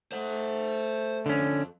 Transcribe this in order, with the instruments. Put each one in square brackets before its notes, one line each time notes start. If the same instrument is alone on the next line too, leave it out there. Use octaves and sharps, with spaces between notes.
[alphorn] A3 [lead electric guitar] C5 F#5
[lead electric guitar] C2 F2 [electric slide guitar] D3 C#4